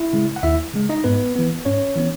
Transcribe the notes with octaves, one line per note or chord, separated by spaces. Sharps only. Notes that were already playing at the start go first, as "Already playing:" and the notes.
Already playing: E4
C#3 G#3
F#5
D#2 E4 E5
C#3 G#3
D#4 D#5
G#2 B3 B4
E3 B3
G#2 C#4 C#5
E3 B3